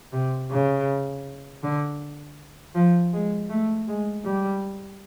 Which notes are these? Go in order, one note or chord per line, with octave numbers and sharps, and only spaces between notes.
C3
C#3
D3
F3
G#3
A3
G#3
G3